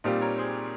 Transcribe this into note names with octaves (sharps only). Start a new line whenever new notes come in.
A#2 G3 C4 D#4 F4 G4
A#4 C#5
G#4 C5